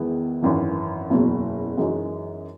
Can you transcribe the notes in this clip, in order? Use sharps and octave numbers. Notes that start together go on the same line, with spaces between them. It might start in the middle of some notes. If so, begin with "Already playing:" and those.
Already playing: E2 D#3 G#3 B3 E4
G#1 F#2 E3
F#1 E2 B2 F#3
F#2 E3 G#3 D#4 F#4